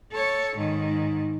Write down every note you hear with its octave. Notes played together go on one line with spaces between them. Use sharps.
A4 C#5
G#2 D#3